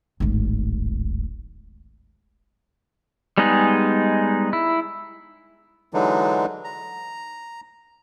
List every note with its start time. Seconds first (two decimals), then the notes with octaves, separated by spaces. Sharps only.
0.20 D1 G#1
3.38 G3 G#3 B3 D#4 G#4
4.53 E4
5.94 D3 E3 F#3 G#3 D4 D#4
6.64 A#5